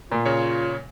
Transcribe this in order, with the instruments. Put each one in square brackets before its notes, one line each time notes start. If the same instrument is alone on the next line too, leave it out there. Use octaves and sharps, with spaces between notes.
[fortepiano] A#2 [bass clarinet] F4
[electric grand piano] C#3 C#5